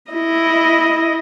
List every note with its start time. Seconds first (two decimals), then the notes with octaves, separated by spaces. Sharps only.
0.11 E4 D#5